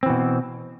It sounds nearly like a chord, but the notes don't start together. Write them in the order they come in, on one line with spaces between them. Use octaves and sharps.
C4 E3 B2